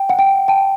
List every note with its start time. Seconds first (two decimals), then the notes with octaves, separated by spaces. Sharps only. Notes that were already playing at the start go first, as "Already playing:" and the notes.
Already playing: G5
0.09 F#5
0.19 G5
0.48 G5 A5